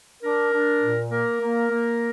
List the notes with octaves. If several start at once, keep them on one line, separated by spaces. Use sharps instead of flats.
D4 A#4
D4
A#2
A#3 A#4
A#3
A#3